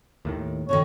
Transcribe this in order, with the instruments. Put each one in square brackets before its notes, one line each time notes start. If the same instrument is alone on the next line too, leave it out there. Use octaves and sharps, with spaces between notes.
[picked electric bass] D#2 A2 D#3
[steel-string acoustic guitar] B2 D3 D#3 [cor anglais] C#5